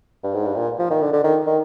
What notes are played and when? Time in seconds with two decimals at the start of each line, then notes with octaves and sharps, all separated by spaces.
0.24 G2
0.34 G#2
0.46 G2
0.57 A#2
0.79 F3
0.90 D#3
1.02 D3
1.13 D3
1.24 D#3
1.46 D#3